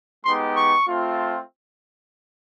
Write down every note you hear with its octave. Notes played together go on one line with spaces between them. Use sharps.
G#3 B3 D#4 G4 C6
C#6
A3 C4 F4